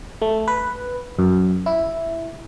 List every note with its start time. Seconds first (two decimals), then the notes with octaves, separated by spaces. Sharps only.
0.22 A3
0.48 B4
1.19 F#2
1.66 E4